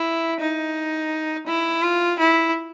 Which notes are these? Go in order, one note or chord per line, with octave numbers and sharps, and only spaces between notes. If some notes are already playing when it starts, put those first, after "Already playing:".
Already playing: E4
D#4
E4
F4
E4